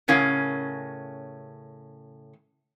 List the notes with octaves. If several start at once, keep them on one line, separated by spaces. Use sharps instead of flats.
A2 C#3 C#4 A#4 F5